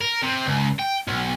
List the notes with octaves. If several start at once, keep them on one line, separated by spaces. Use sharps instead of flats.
A#4
C3
C#2
G5
B1